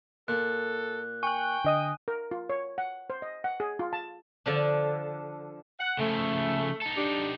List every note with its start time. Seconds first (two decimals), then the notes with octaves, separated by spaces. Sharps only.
0.28 A#2 A4 F#6
1.23 G5 G#5 C#6 F#6
1.65 D3 D#5 D#6
2.08 A#4
2.31 F4
2.49 C#5
2.78 F#5
3.10 C5
3.22 D#5
3.44 F#5
3.60 G#4
3.79 F4
3.93 A5
4.46 D3 F3 D4
5.79 F#5
5.99 C#3 F3 A3
6.82 D#4 A4
6.97 D4 G4